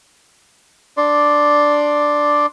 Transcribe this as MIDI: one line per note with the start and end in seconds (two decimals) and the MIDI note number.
0.97 2.46 62
0.97 2.46 74
0.97 2.46 84